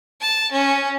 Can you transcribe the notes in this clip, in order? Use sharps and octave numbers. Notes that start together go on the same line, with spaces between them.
A5
C#4